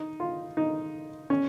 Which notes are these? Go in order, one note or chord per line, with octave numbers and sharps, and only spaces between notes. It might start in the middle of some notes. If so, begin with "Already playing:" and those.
Already playing: D#4
F4
D#4
C#4